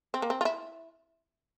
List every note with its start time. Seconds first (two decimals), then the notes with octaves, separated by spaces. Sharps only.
0.14 C4
0.22 A#3
0.30 C4
0.41 F4
0.45 E4